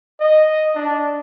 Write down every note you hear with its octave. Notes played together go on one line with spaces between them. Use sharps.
D#5
D4